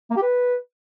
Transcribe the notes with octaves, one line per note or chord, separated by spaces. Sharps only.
A#3
G4
B4